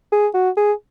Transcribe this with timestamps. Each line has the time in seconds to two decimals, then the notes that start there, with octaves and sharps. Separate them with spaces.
0.12 G#4
0.34 F#4
0.57 G#4